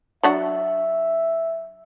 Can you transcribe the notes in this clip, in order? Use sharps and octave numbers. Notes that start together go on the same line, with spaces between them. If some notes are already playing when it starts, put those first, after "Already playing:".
F#3 D4 F#4 E5